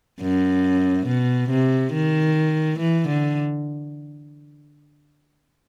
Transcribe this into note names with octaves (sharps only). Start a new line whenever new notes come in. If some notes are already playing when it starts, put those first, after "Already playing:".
F#2
B2
C3
D#3
E3
D3